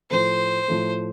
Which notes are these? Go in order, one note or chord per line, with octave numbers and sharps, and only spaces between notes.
A2 F3 A3 C5
A2 F3 A3